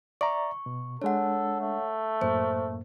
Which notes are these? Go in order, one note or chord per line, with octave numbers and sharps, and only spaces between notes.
D5 E5 A#5 C#6
B2
G#3 D4 A4 C#5 F#5
A3
F#2 A2 A#3 C5